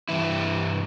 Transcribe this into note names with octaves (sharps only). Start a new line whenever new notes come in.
G2 E3 E4